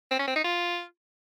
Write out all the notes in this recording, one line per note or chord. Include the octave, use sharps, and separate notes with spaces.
C4
C#4
C4
D#4
F4